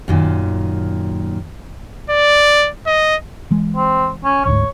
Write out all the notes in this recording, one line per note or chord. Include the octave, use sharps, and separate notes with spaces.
F#2 A#2 D#3
D5
D#5
E3 G#3
C4
C#4
G1 D2 G#2 C#5